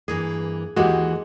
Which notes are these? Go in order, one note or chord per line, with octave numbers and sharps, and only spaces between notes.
G2 E3 A#3 G#4
D#2 E3 G#3 A#3 F#4 G4